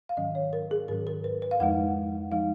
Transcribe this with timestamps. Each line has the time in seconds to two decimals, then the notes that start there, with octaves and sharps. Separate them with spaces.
0.09 F5
0.17 G#2 D#3 F#3 C#4 D#5
0.35 C#5
0.53 A#4
0.71 G#4
0.88 G#2 D#3 F#3 C#4 A#4
1.07 A#4
1.24 B4
1.42 B4
1.51 F5
1.60 F2 F3 G#3 D#4 F#5
2.32 F3 G#3 D#4 F5